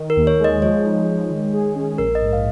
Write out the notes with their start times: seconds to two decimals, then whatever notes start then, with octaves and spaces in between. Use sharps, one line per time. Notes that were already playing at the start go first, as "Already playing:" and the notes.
Already playing: D#3
0.10 A#4
0.16 D#2
0.27 C#5
0.39 G#3
0.44 D#5
0.62 F3 C#5
0.85 D#4
1.07 G#3
1.30 D#3
1.53 G#4
1.75 C#4
1.98 A#1 A#4
2.15 D#5
2.22 G#2
2.33 F5